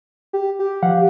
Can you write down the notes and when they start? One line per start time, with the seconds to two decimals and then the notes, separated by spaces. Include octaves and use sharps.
0.33 G4
0.59 G4
0.83 F3 F5 F#5